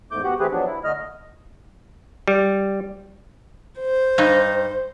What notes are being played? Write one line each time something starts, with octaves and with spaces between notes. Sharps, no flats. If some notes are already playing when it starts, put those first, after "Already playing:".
E2 G#2 A3 D6 G6
B3 F#4 G4 F#5
E3 A3 C4 G4 G#4 B4
F3 F#3 B3 D4
E4
D3 A3 D#5 F6
G3
C5
G2 D#4